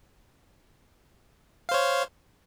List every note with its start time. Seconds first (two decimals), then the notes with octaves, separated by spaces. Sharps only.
1.69 F5
1.71 C5
1.74 C#5